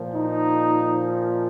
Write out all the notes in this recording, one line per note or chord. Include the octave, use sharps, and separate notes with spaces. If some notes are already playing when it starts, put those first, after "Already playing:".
Already playing: A#2 F3
D#4